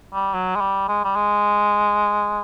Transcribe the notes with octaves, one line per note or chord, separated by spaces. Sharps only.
G3
F#3
G#3
G3
G#3
G3
G#3